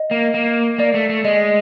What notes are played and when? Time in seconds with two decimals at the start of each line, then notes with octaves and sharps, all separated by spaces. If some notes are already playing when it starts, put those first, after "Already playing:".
Already playing: D#5
0.11 A#3
0.34 A#3
0.78 A#3 D5
0.94 A3
1.09 A3
1.24 G#3 D#5